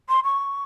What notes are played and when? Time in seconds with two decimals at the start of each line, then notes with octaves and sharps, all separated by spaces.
0.08 C6
0.23 C#6